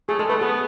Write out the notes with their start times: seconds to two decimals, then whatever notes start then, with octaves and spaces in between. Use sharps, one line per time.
0.09 A3 G#4
0.19 G#3 A4
0.30 A3 B4
0.41 B3 G#4